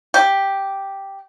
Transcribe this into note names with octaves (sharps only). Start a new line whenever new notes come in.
G4